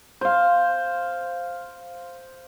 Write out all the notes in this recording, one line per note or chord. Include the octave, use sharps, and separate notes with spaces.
C5 F5